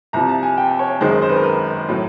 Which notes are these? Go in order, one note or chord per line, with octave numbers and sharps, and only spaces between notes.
C2 C3 F3 A#5
A5
G#5
G5
C#5
G#1 F#2 D#3 G#3 C5
C5
B4
A#4
B4
A2 F#3